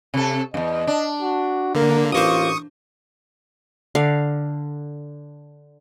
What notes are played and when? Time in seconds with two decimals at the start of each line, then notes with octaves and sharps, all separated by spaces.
0.14 C3 A4
0.54 E2 G2 D#5
0.87 D4
1.22 F#4
1.75 D3 A#3 A#4
2.12 A1 A#3 F4 C5 C#6 D#6
3.95 D3 F5